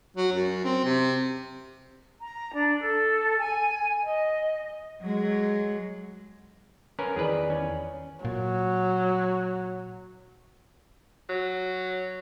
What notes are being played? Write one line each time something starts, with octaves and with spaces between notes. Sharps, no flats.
F#3
F#2
C4
C3
A#5
D4
A4
G#5
D#5
F#3 G#3
C#4 A#4 B4
E2 D#3 G#4 B4 D5
C#4
A#2 F#3
F#3